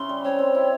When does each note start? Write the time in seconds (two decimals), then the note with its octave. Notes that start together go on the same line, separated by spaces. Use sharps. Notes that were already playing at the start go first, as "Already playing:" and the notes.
Already playing: C#3 C#4 E4 C6
0.09 G3
0.24 C4 C#5
0.39 C4
0.55 E4